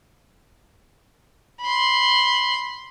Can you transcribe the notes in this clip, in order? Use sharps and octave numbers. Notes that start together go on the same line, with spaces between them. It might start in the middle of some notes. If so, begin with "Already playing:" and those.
B5 C6